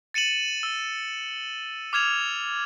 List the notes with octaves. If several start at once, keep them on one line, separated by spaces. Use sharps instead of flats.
A6 C#7 D#7 E7 F#7
E6
D6 F6 G#6 E7 F7